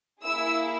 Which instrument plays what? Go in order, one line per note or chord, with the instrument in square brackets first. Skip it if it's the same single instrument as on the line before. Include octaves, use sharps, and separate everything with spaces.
[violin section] A#3 E4 G#4 E6